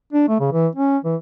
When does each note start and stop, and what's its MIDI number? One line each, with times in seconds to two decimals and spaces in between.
0.13 0.26 62
0.28 0.37 57
0.40 0.50 49
0.52 0.68 52
0.76 0.98 61
1.05 1.16 52